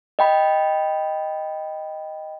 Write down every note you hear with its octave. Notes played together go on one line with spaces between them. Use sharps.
D#5 G5 B5